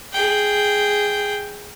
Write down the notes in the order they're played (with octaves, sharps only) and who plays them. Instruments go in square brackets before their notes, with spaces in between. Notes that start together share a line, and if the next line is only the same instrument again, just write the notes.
[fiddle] G#4 G5